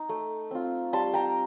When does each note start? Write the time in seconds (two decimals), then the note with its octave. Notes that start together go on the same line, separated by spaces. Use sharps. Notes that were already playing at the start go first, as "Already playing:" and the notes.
Already playing: D#4 A#5
0.09 A3
0.51 C4 F4
0.93 G3 A5 C6
1.14 G5 A#5